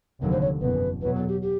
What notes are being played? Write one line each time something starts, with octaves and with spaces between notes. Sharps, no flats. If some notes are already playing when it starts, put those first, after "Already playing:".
F1 D#2 D3 F#3 A#4
C5
C#5
F#1 E2 B2 B4
E2 B2 F#3 B4
A4
G4
G4